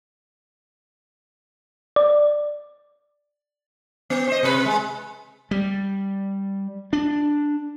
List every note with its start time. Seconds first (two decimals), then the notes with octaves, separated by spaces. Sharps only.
1.96 D5
4.10 B3
4.28 C5 D#5
4.43 C3 B4
4.65 G#3
5.51 G3
6.93 D4